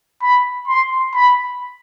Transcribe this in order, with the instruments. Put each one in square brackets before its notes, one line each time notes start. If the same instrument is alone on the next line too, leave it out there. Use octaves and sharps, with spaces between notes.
[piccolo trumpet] B5
C6
B5